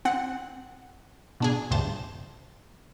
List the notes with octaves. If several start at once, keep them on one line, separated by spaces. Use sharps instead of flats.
C4 F#5
B2 D4 G#4
D2 G2 C5 A5